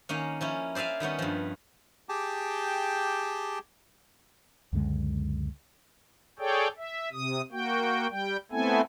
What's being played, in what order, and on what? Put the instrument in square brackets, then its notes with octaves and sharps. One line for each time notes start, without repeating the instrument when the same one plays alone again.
[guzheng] D#3 A#3 C#4
F3 C#4 E4
C5 D5 E5 F5 G#5
D#3 G3 B3 C#4
G2 F3
[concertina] G4 G#4 G5 A5 D6
[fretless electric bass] C#2 F#2 D3 G#3
[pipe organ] G#4 A4 C#5 D5 G5
E5
C3 D#6
A#3 F#4 G5
G3 G5
A3 B3 C4 E4 A4 G#5